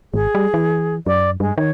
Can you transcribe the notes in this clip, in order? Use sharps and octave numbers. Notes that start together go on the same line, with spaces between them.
G#1 G#4
G3
E3
F#2 D5
G2 G#3
D#3 C#5